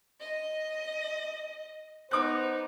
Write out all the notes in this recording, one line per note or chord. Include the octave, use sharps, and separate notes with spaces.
D#5
B3 D#4 C5 D6 F#6